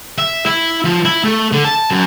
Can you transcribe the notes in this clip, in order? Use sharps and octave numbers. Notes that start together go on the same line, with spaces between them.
E5
E4
F3
E4
A3
D3
A5
F#2